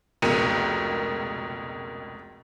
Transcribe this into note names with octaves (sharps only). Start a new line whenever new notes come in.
F1 C#2 B2 A#4 C#7